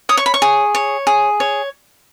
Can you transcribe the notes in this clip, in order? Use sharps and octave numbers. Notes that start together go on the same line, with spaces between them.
C#5 D#6
C#6
B5
C#6
G#4
C#5
G#4
C#5